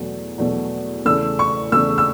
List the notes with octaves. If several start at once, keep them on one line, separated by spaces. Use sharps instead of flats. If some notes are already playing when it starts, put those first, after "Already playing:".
Already playing: E2 B2 F#3 A3
E2 B2 F#3 A3
E2 C#3 A3 E6
C#6
E2 C#3 A3 E6
E6